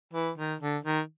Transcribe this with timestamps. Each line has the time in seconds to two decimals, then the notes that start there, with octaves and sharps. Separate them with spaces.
0.13 E3
0.38 D#3
0.61 D3
0.84 D#3